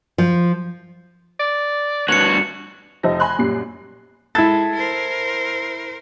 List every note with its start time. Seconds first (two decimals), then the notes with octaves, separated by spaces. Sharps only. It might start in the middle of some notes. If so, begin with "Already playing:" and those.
0.18 F3
1.40 D5
2.08 G2 B3 F#4 C#5 C#7 F7 F#7
3.03 F1 F3 D#4 E5 A#6
3.20 G#5 B5 C6 F#6
3.38 F#2 A#2 G3 C7
4.35 G#3 E4 A4 G#6 A6
4.74 A#4 C5